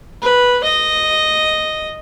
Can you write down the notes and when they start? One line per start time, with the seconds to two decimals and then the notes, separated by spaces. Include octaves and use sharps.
0.22 B4
0.64 D#5